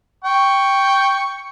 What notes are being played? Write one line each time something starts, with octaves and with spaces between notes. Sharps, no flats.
G5 C#6